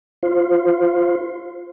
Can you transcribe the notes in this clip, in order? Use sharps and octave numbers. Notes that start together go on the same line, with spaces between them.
F4 C5